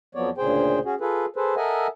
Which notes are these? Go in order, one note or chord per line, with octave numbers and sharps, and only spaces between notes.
F2 F3 F#3 B3 C#5 D5
D2 A#2 C#3 G#4 C5 G5
C#4 F#4 G#4
F4 G#4 A4 B4
G#4 A4 B4 C5
A4 A#4 D#5 E5 F#5 G#5